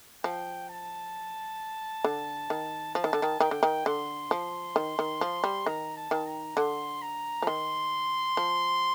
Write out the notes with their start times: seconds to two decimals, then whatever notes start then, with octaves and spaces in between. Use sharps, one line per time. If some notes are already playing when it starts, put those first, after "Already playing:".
0.24 F3 G5
0.69 A5
2.04 D3
2.50 D#3
2.95 F3 A5
3.04 D#3
3.13 D3
3.22 D#3
3.40 D#3 G5
3.51 D3
3.63 D#3
3.86 D3 C6
4.31 F3
4.76 D#3
4.99 D#3
5.21 F3
5.44 G3
5.66 D#3 A#5
5.97 A5
6.11 D#3
6.26 A#5
6.57 D3 C6
7.02 A#5
7.42 F3
7.47 D#3 C6
8.37 F3